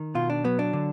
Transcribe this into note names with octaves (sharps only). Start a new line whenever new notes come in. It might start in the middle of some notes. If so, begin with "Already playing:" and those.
Already playing: D#3
B2 F4
D4
F#3 B3
D4
D3